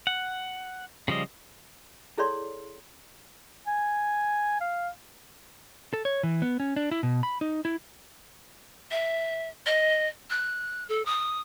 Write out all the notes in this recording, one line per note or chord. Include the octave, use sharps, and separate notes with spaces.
F#5
C#3 F3 G3 D#5
E4 G#4 A4 C#5 D5 C6
G#5
F5
A4
C#5
E3
B3
C#4
D4
E4
B2
B5
D#4
E4
E5
D#5
F#6
A4
D#6